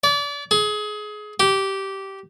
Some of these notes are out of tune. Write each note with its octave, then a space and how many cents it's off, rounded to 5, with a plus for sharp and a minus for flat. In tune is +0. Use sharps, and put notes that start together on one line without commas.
D5 -35
G#4 +25
G4 -15